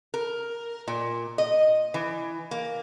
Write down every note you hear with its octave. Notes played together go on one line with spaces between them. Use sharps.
A#4
A#2
D#5
E3
A#3